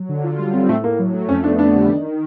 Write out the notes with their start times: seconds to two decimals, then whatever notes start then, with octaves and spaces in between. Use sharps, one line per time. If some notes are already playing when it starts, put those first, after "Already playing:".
Already playing: F#3
0.09 D3
0.24 F4
0.39 G3
0.54 C4
0.69 A2 A3
0.84 A2 A#3
0.99 F#3
1.14 A3
1.29 F2 C#4
1.44 B3 D4
1.59 D3 D4
1.75 G3
1.90 D#3
2.04 D#3